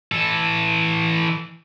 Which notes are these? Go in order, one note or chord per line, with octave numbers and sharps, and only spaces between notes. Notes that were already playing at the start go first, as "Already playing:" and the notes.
E3 A4